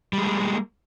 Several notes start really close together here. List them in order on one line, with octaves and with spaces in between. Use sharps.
G3 G#3 A#3